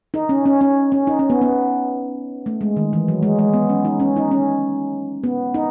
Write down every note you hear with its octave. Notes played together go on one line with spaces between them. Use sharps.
D#4
C#4
C#4
C#4
C#4
D#4
C#4
B3
B3
A3
G#3
D#3
E3
F#3
G#3
G#3
B3
C#4
D#4
C#4
D#4
C#4
B3
D#4